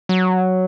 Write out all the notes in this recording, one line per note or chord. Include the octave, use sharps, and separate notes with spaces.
F#3